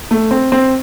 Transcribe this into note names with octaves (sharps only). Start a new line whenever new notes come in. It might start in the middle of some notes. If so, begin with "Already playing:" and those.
A3
C4
C4